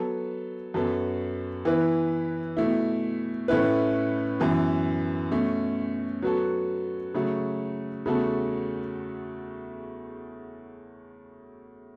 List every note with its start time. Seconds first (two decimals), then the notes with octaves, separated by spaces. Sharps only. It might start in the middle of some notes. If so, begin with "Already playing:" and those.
Already playing: F#3 B3 A4
0.74 F#2 F#3 B3 A4
1.65 E3 B3 E4 B4
2.57 B2 A3 E4
3.48 A2 A3 C#4 E4 B4
4.40 F#2 E3 B3
5.31 B2 A3 C#4
6.22 F#3 B3 F#4 A4
7.14 C#3 F#3 A3 F#4
8.06 E2 C#3 A3 F#4 A4